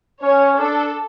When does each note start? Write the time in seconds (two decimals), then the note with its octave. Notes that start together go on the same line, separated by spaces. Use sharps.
0.22 C#4 C#5
0.58 D4 A4